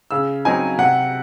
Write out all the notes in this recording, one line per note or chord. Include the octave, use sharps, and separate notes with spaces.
C#3 E6
F#3 C4 D#4 G#5
C3 F#5